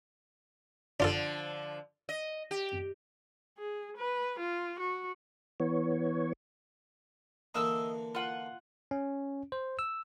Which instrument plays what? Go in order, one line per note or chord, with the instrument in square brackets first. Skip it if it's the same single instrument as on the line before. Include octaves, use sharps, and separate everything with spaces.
[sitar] D3 F3 [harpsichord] D4 F4 A4
[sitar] D#5
G4
[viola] G#4
B4
F4
F#4
[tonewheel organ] E3 B3 C#5
[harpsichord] D3 E3 A#3 [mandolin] D#5 E6
[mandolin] F4 F#5
[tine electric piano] C#4
C5
E6